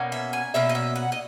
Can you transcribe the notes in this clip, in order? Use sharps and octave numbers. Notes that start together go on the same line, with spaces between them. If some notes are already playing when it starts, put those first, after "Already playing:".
Already playing: B2 A#3 C#4
E5
G#5
B2 A#3 C#4 E5
D#5
E5
F#5
D#5